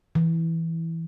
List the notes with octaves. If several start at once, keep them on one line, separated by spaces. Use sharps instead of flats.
E3